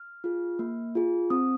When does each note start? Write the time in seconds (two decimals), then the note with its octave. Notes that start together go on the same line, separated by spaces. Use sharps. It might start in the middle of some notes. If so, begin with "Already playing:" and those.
Already playing: F6
0.24 F4 G#4
0.59 A#3
0.95 F4 G#4
1.30 C4 D#6